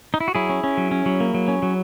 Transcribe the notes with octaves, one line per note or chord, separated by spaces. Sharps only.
D#4
E4
F#4
F#3 E4 G#4
C#4
C#4
F#3
C#4
F#3
A#3
F#3
C#4
F#3